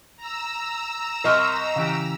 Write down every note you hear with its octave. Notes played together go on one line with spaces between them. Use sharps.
A#5 E6
C2 A#4 D#5 C6 C#6
C#3 E3 G4